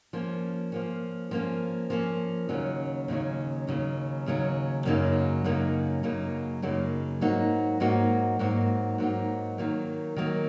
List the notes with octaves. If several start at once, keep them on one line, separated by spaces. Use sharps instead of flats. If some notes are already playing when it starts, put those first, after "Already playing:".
F3 A#3 C#4
F3 A#3 C#4
F3 A#3 C#4
F3 A#3 C#4
D#2 C#3 F#3 C#4
D#2 C#3 F#3 C#4
D#2 C#3 F#3 C#4
D#2 C#3 F#3 C#4
F#2 C#3 F#3 A#3 D#4
F#2 C#3 F#3 A#3 D#4
F#2 C#3 F#3 A#3 D#4
F#2 C#3 F#3 A#3 D#4
G#2 F#3 A#3 D#4 F#4
G#2 F#3 A#3 D#4 F#4
G#2 F#3 A#3 D#4 F#4
G#2 F#3 A#3 D#4 F#4
D#3 F#3 A#3
D#3 F#3 A#3